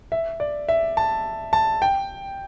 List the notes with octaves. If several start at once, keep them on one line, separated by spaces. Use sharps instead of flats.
E5
D5
E5
A5
A5
G5